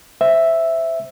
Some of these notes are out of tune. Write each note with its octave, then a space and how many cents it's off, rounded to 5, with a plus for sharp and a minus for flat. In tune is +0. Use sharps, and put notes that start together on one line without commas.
C5 +0 E5 +0